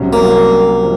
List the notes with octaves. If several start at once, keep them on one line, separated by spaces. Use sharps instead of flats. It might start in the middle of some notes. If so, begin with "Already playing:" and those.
Already playing: C2 C3 F#3 C#4
A#3
F3